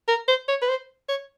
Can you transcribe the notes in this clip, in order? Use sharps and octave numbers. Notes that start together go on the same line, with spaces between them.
A#4
C5
C#5
B4
C5
C#5